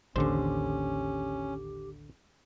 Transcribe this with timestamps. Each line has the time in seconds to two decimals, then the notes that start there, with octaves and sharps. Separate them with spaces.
0.16 A1 D#2 D3 C#4 G4 C5